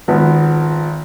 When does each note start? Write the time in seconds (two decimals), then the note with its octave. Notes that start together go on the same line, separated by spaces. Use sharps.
0.08 G#1 F3 B3